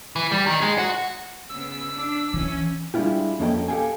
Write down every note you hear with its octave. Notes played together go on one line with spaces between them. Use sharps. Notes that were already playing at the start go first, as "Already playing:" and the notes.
E3
G3
D#3
G#3
F#4
C#3 B3 E6
D4
E3 C#4
G3 G#3 D4 E4 F4 G4
F2 A#3 C#4 A4 D#5 G5
G4 A4 C5 F5 G5 G#5